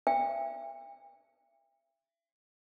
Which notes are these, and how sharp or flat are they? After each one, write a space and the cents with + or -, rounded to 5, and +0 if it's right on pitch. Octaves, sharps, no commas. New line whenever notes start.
E5 +35 G5 +40